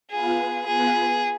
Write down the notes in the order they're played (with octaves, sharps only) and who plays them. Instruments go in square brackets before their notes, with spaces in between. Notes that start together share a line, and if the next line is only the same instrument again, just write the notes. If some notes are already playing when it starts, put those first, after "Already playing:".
[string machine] B3 F4 B4 F5 [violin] G#4
[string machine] B3 F4 B4 [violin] G#4